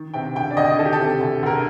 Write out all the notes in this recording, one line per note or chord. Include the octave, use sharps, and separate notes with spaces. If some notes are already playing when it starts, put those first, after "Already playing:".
Already playing: D#3
C3 G5
D2 G5
D5
D2 D#5
D#3 A4
G4
A4
C3
D2
D2 A#4